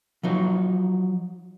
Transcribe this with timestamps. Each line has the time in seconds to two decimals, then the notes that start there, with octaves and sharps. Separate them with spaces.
0.23 F3 F#3 D#4